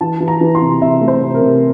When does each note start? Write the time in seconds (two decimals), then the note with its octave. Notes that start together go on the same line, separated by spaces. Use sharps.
0.01 E3 A5
0.20 E3
0.28 A#5
0.41 E3
0.55 C6
0.61 C3
0.81 C3 E5
1.01 A3
1.08 C5
1.21 C3
1.35 A#4
1.42 C3